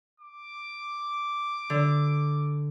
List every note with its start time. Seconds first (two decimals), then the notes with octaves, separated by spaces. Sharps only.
0.20 D6
1.70 D3